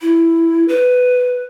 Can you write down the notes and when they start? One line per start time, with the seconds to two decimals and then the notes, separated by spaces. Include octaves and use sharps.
0.01 E4
0.68 B4